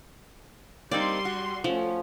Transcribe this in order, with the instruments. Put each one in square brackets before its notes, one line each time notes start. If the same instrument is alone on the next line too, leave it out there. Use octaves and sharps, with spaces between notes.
[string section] G3 C6 [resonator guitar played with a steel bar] A#3 C4 D#4 [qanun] D5
[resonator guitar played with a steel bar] F#4
[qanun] F3 [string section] A3 C#4